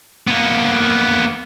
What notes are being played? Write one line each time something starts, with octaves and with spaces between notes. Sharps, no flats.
A#3 B3